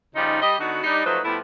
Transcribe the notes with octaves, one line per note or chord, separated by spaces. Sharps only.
C#3 F3 G3 D#4
G3 G4 D#5
D3 B3 D#4 F#4
G3 D4 D#4
F3 F#3 A3 D#4 B4 C5
A2 F3 G3 A3 B3 E4